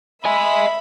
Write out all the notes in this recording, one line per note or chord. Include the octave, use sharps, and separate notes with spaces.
D#5 E5 G#5 B5